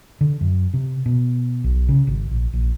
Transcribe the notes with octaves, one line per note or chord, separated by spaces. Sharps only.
D3
F#2
C3
B2
B1
C#3
G#1
A#1
A#1